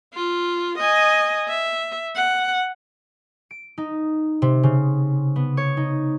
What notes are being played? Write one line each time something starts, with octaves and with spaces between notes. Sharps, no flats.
F4
D#5 G#5
E5
F#5
D7
D#4
C3
C#3
B3
C#5
D#4